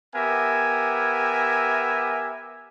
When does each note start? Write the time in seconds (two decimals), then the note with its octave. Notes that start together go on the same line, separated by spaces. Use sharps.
0.15 B3 G4 A#4 E5 G#5